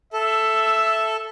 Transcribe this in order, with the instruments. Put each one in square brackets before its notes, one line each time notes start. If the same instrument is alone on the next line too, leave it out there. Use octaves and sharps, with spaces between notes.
[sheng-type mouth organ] A4 [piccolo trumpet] E5